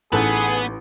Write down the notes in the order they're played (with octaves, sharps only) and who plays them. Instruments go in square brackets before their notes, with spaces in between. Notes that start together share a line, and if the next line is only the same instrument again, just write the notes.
[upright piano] A1 [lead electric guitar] B3 [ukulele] D#4 A4 B4 [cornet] G#4